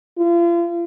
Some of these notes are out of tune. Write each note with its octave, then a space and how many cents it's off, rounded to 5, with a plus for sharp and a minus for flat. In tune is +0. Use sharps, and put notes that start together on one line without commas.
F4 -35